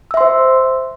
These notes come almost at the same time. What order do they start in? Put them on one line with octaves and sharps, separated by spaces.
E6 E5 C6 C5